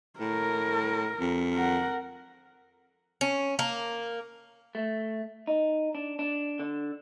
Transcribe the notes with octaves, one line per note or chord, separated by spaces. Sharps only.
A2 A#4
F2
A#4 F#5
C#4
A#3
A3
D#4
D4
D4
D3